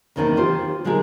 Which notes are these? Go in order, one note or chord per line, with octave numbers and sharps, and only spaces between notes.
E2 C3 D#3 A#3 C4 D4
F4 G4 C5
D3 G#3 D#4 G#4 A#4